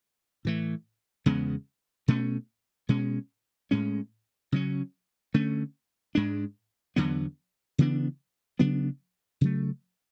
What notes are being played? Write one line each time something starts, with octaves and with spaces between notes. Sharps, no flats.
A2 E3 A3
E2 C#3 G#3 B3
B2 A3 C#4
B2 G#3 C#4
A2 G#3 C#4
C#3 F#3 C#4
D3 A3 C#4
G#2 G#3 D4
E2 D3 F#3 B3
C#3 E3 B3 D4
C#3 F#3 B3 D4
C#3 F#3 A3